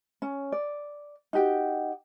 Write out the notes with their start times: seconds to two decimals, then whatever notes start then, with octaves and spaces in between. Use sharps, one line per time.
0.22 C#4
0.52 D5
1.33 D#4 F#4 G4 G5